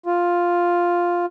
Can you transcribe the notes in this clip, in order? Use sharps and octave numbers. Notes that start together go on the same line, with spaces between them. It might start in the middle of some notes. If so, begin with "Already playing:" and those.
F4